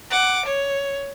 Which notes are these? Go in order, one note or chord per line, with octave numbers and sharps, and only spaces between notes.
F#5 D6
C#5